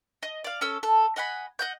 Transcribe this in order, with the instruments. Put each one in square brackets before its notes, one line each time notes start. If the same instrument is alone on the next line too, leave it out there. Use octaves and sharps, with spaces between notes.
[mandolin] D#5
D5 F5
C#4 A4 E6
A4
D#5 F#5 G#5 B5
D#5 F#5 G6